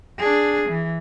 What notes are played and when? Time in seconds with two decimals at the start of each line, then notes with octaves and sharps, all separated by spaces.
0.19 D4 G#4
0.69 E3